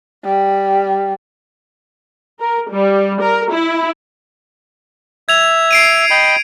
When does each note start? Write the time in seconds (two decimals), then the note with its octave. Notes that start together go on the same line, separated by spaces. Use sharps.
0.25 G3
2.40 A#4
2.71 G3
3.21 A#4
3.53 E4
5.29 E5 G#6 F7
5.71 C7 D7 D#7
6.10 D#5 G5 B5